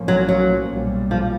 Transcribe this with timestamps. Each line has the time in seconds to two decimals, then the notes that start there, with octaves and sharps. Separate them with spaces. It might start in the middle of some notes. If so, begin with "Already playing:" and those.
Already playing: B1 A2 F3 A#3 C#4
0.08 F#3
0.29 F#3
0.70 B1 A#2 G3
1.11 F3